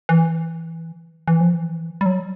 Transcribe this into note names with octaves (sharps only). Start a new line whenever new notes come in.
E3
E3
F3
E3
G3
F#3